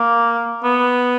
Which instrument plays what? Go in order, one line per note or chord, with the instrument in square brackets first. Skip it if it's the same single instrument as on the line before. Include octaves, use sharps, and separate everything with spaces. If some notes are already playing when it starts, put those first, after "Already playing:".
Already playing: [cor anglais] A#3
B3